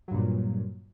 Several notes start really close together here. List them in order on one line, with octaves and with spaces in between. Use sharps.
F#3 G2 A#2